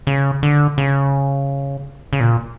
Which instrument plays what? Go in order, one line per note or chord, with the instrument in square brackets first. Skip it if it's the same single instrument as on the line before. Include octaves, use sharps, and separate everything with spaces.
[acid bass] C#3
D3
C#3
C#3
A#2